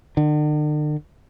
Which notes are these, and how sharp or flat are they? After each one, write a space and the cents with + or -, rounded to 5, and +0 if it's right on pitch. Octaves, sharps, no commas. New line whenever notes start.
D3 +45